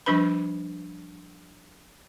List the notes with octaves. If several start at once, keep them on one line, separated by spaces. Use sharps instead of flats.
F3 G3 D4 B4 B5